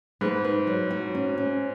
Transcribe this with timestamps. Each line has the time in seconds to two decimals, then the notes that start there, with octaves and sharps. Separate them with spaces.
0.21 G#2 B4
0.45 B4
0.67 F#3
0.91 F#4
1.15 C#4
1.38 C#4